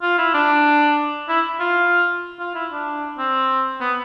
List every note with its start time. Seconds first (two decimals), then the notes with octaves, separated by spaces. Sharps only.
0.02 F4
0.18 E4
0.34 D4
1.29 E4
1.60 F4
2.39 F4
2.55 E4
2.71 D4
3.18 C4
3.81 B3